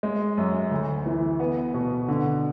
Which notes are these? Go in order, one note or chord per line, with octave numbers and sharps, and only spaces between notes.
G#3
F#2
D2
E3
B3
B2
D3